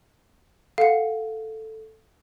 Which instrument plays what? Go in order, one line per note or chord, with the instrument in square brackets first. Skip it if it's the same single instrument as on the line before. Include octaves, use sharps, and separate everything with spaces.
[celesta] A4 [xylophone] F5 F#5